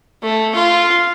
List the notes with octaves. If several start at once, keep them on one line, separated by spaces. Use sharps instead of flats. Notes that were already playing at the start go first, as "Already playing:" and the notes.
A3
F4